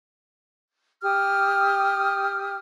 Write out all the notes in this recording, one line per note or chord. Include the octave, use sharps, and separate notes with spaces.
G4 D#6 F6